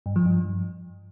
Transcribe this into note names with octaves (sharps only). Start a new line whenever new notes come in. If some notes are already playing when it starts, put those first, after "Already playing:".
G2
F3
G2